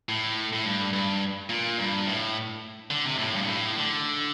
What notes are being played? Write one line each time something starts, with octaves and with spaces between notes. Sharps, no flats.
A2
A2
G2
G2
A#2
G2
A2
D3
C3
A2
G2
A#2
A2
D3